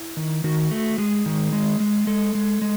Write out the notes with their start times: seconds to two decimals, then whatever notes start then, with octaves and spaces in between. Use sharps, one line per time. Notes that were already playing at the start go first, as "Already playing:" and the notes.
Already playing: E4
0.17 D#3
0.44 D#3 F#4
0.71 A3
0.98 G#3 G#4
1.26 D#3
1.53 G#3
1.80 G#3
2.07 G#3 A4
2.35 G#3
2.62 G#3